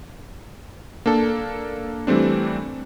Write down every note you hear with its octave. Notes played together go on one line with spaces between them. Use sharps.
A#3 D4 A4
E3 G3 A3 C4 D4